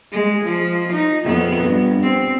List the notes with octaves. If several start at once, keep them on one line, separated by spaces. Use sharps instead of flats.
G#3
F3
D#4
F2 B3
G2
C4